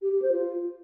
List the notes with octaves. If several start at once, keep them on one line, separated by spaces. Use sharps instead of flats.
G4
G4
C5
F4